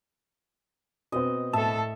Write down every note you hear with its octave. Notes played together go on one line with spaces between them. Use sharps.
B2 B3 C4 D#5
A2 A4 E5 A5